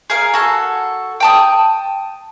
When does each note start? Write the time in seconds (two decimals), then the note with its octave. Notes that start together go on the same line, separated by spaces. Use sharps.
0.10 G#4 A#4 F5 G#5
0.34 F#4 A4
1.20 G5 A5 D#6